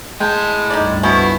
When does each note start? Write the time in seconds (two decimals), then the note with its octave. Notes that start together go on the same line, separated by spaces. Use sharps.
0.20 A2 G#3 G5 A5
0.70 C#2 G2 D#4 D5
1.03 B2 F3 G#3 A3 E4